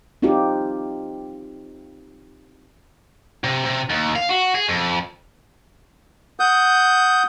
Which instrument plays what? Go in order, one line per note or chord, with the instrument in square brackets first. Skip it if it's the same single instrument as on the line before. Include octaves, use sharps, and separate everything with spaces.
[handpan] C4 D#4 F4 G4
[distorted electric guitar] C3
C3
D#2
F5
F#4
G#4
F2
[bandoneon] F#5 D#6 G6